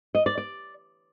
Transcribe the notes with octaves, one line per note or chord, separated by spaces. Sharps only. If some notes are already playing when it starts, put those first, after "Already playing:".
D#5
D5
D5